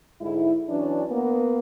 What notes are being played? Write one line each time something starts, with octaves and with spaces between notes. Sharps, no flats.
G#2 D3 G#3 E4
E3 F#3 C#4 D4
A#3 B3